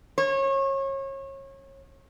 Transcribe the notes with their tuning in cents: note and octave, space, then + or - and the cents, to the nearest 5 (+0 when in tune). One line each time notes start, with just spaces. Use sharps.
C#5 -30